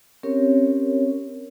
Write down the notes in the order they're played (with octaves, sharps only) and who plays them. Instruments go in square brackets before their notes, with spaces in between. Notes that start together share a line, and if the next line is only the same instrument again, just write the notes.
[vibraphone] C4 C#4 G4 A#4 C#5